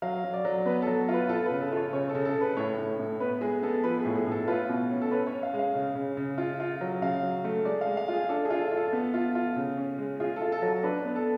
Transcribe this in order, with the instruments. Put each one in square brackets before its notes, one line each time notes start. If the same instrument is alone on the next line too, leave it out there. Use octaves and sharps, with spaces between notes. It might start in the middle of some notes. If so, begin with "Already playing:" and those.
[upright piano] F#3 F5
F#3
D5
F#3
B3 B4
A4
F#3
F4
B4
F4 A4
B4
C#3
A4
F4 C#5
C#3 C#5
A4
C#3
A4
C#3
B4
A2 C#5
A2
A2
B3 B4
G#3 G#4
B3 A4
F3 B4
G#4
A2
G#4
A2 A4
F4 B4
B2
C#4
A4
C#4 B4
C#5
C#4
F5
G#3
F5
C#3
C#3
C#3
F4
F4
F#3
C#3 F5
F#3
A3
G#3 D5
F5
G#3
F5
F4
G#4
D4 A4
G#4
F4
A4
F4
A4
B3
F4
F4
C#3
C#4
G#3
F4 G#4
A4
F4
A4
F#3
A4
D4 B4
B3
A4